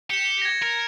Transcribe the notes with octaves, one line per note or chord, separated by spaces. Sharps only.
G4 C#7 E7
G#6 A#6
A#4